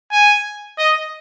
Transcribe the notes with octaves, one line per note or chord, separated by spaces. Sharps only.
G#5
D#5